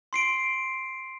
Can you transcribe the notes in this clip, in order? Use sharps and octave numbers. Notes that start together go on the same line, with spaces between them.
C6 C7 D7